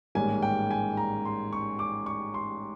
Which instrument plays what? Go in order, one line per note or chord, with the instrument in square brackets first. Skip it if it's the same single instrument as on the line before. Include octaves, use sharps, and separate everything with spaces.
[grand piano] A1 G#2 D#3 G3 A#3 G#5
G5
G#5
A#5
C6
C#6
D6
C#6
C6